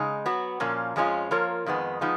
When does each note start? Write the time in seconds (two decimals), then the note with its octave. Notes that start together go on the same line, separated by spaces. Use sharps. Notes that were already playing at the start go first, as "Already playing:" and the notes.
Already playing: C#3 G#3 D#4
0.26 F#3 B3 F#4
0.60 A#2 F3 A#3 C#4
0.96 F2 F3 G#3 C#4 F4
1.31 F3 A#3 F4 A#4 C#5
1.66 F2 D#3 G#3 B3
2.01 F3 G#3 B3 D#4